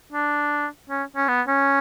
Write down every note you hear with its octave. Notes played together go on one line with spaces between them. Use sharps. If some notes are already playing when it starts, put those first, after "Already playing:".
D4
C#4
C#4
B3
C#4